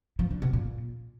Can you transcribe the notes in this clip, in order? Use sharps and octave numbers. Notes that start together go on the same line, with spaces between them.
F3
D3
B2
A#2